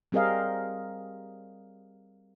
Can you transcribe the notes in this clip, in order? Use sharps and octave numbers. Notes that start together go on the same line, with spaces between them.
G3 C4 G#4 A#4 D#5 F5